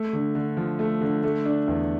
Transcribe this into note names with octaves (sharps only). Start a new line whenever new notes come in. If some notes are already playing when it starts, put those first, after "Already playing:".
Already playing: A3
D3
D3
F3
A3
D3
A3
D4
E2